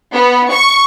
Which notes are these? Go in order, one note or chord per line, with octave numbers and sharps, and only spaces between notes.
B3
C#6